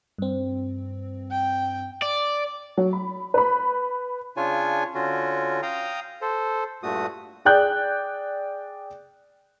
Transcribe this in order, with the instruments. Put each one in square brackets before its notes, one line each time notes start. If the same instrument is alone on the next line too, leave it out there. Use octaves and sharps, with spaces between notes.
[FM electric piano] G2 C4
[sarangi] G5
[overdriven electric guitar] D5
[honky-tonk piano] F#3
B5
B4 B5
[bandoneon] C#3 D4 F4 C#5 G#5
D3 C#4 F4 F#4
F5 G5 A#5 D#6
A4 C5
G2 A#2 A3 F#4 D#6
[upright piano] G#4 D5 G5 F#6 G6